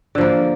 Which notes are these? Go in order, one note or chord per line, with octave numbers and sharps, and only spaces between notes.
D3 F3 A#3